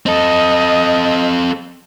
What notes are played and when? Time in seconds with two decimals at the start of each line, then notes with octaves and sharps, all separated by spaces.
0.06 C4 A4 D#5